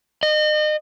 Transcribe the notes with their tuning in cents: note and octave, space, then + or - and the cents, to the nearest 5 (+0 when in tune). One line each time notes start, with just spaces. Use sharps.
D#5 -35